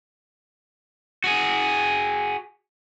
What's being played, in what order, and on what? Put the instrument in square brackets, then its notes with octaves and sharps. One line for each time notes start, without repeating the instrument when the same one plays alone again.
[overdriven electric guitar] F#4 G#4